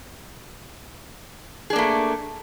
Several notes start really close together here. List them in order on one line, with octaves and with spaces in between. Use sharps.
G#4 D4 A#3 A3